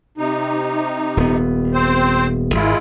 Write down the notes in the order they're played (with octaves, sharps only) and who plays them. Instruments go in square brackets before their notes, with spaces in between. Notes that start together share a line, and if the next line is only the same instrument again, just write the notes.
[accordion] C3 D#4
[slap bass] D#1 B3
[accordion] C4 C5
[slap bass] G#1 [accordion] G#3 E4 F4